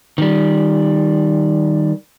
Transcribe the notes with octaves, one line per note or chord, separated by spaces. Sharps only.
D#3 G3